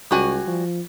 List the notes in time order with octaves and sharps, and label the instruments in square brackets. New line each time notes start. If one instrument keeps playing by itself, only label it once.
[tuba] C#2 [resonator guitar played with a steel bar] G3 F#4 G#5
[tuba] F3